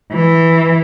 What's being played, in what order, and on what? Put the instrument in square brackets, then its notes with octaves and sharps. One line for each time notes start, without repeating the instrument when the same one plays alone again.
[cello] E3